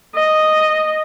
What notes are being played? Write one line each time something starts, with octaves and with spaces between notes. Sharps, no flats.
D#5